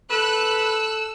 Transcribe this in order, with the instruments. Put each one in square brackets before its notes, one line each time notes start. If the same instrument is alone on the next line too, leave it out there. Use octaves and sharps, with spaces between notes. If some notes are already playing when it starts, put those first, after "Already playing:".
[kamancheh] A4 [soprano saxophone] B4 [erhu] E6 [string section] F#6